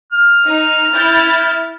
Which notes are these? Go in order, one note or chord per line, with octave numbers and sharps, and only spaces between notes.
F6
D#4
E4 G6 A6